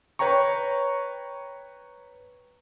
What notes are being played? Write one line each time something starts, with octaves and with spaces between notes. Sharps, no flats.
B4 C#5 G5 A#5 C#6